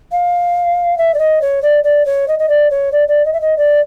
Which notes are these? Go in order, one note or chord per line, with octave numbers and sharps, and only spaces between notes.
F5
E5
D5
D#5
C#5
D5
D5
C#5
D#5
D#5
D5
C#5
D5
D5
D#5
E5
D#5
D5